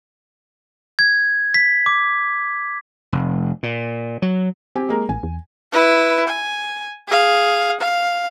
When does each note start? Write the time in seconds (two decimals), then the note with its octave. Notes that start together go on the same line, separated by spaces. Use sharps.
0.99 G#6
1.54 B6
1.86 D6
3.12 F1
3.63 A#2
4.22 F#3
4.75 C4 G4 G#5
4.89 G#3 A#3 A#4
5.09 A1 G#5
5.23 E2
5.72 E4 B4
6.27 G#5
7.08 G#4 F5
7.80 F5